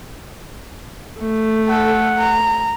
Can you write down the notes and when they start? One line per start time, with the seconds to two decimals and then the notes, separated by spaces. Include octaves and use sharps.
1.20 A3
1.69 A4 F#5
2.18 A#5